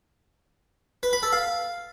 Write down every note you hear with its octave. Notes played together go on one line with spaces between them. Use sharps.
B4
B5
A4
F5